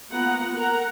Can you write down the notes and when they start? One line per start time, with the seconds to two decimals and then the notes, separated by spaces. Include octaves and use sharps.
0.11 A#3 B3 F4 F#5 A#5
0.54 A#4 F#5 A#5